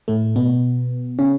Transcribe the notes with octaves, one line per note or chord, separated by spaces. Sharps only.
A2 A3
B2 B3
C#3 C#4